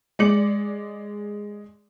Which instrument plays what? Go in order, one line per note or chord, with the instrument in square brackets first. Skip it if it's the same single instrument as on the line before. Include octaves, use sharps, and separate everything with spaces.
[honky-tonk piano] G#3 D5 D6 C#7 F#7